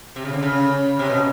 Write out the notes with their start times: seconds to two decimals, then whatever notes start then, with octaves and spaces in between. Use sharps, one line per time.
0.16 C3
0.25 C#3
0.33 D3
0.42 C#3
0.99 C3
1.10 B2